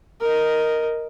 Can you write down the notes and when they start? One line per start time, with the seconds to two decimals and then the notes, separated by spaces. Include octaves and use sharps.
0.21 A#4 D#5